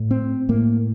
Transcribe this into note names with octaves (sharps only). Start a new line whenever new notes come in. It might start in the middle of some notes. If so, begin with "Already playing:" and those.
Already playing: A2
C4
A2 A#3